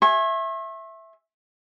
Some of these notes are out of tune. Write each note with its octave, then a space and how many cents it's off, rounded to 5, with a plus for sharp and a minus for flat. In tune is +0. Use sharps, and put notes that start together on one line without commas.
E5 +0 G#5 +0 C#6 -45